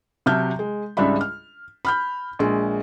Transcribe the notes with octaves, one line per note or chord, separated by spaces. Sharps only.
C3 F#3 E5 A5 F6 G6
G#3
C#2 G#2 G3 D4 E5 B5
F6
B5 F6 G6
A#1 G#3